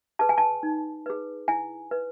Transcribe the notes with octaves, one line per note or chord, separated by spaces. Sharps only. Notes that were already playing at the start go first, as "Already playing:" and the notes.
G#4 B4 A5
G#5
A5
D#4
G#4 B4
E4 G#5
B4